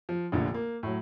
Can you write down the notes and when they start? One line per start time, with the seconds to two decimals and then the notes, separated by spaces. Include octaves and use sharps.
0.09 F3
0.32 F1 A#1 A#2 D3
0.54 A#3
0.83 A2 F#3